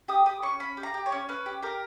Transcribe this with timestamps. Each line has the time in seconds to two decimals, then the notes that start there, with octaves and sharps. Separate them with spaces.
0.08 G4 D#6
0.26 G4 D#6
0.42 C#4 C#6
0.60 C#4 B5
0.77 G4
0.83 A#5
0.94 G4
1.06 C#5
1.12 C#4
1.29 C#4 B4
1.46 G4
1.62 G4 A#4